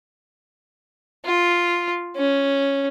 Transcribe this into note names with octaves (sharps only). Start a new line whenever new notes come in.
F4
C#4